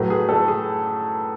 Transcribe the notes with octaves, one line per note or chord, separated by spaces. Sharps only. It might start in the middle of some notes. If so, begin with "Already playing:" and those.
Already playing: A2 F#3 A3 B4
G#4
A4
G#4